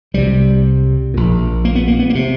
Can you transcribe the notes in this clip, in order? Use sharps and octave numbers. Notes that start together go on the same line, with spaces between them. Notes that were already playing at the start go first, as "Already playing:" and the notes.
C2 C3 G3
A#1 A#2
A#3
B3
A#3
B3
A#3
C3